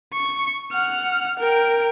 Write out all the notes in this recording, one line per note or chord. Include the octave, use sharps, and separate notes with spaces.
C#6
F#5 F6
A#4 G5